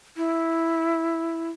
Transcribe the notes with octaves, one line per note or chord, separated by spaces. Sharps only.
E4